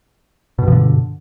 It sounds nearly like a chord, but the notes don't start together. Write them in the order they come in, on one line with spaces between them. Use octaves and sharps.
B2 G2 F3 D3